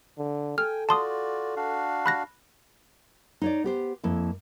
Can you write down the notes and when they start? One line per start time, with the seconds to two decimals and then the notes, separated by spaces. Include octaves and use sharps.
0.18 D3
0.58 A4 G5 G#5 F6
0.89 F4 F#4 D5 A5 C6 D#6
1.56 D4 F#4 F5
2.06 B5 F#6 A#6
3.42 D#4 C#5 D5
3.64 B3 G4 C5
4.04 F2 A#3 E4